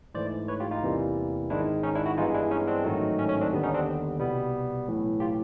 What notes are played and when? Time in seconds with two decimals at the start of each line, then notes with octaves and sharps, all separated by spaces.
0.14 G#2 E3 A3 C5 D5
0.48 B4 C#5
0.60 F4 G4
0.71 D#4 F4
0.83 E2 C3 E3 G3 A#3
1.49 G#1 G#2 D#3 G#3 D4 E4
1.83 C#4 D#4
1.95 D4 E4
2.06 E4 F#4
2.17 G2 E3 G#3 B3 D#4 F4
2.34 D4 E4
2.51 C#4 D#4
2.67 C4 D4
2.84 A1 G#2 D#3 F#3 A3
3.19 C#4
3.29 C#4
3.41 C4 D4
3.52 D#2 D3 G3 B3
3.63 C#4 D#4
3.74 C4 D4
4.19 C2 B2 G3 B3
4.87 B1 A2 E3
5.20 F4 G4